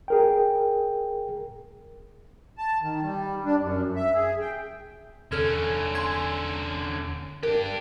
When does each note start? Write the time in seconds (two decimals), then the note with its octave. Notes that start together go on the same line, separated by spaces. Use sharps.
0.08 G#4 A#4 G5
2.58 A5
2.82 D#3
3.02 G3
3.45 D4
3.60 F#2
3.96 E5
4.14 G#4
4.41 G5
5.32 E2 D3 C#4 A4 F6 G#6
5.95 G#5 C6 G#6
7.43 D4 G4 A#4